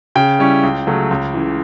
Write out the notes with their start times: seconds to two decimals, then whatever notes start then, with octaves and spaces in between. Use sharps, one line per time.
0.15 C#3 G5
0.39 G3 C#4 E4
0.63 C#2
0.87 C#3 F#3 A3
1.11 C#2
1.34 C#3 E3